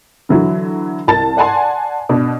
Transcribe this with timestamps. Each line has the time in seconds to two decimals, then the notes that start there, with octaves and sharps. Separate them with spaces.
0.29 D3 E3 F#3
1.07 C2 A5 A6
1.37 D5 F#5 G#5 A5 C6
2.09 B2 D4